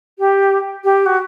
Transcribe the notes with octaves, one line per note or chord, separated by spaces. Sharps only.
G4
G4
F#4